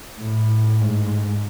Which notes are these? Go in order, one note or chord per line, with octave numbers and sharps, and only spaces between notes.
A2
G#2